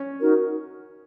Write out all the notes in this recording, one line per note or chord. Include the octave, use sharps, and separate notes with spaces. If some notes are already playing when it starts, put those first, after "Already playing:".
Already playing: C#4
D#4 F#4 A#4